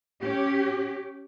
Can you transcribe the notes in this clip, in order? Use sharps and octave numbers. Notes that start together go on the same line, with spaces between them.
C#4 G4